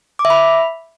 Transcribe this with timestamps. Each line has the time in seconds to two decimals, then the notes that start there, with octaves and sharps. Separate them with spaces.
0.19 D6
0.25 E5
0.30 B5